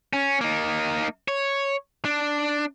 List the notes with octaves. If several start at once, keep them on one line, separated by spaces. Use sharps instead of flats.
C#4
A#3 D#4
C#5
D4